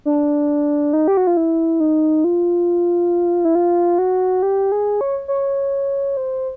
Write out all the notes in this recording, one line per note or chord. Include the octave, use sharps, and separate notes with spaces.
D4
D#4
G4
F#4
F4
E4
D#4
F4
E4
F4
F#4
G4
G#4
C#5
C#5
C5